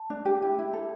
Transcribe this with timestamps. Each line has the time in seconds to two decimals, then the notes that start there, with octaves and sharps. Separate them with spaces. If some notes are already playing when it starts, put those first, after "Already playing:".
Already playing: A5
0.10 D4
0.25 G4
0.42 E4
0.59 E4
0.73 A4